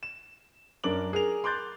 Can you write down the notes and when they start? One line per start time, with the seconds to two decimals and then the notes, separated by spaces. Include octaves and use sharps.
0.03 E7
0.84 F#2 D4 A#4 D6 F#7
1.13 G#4 A#4 F7
1.44 C6 D6 F#6 G6 A6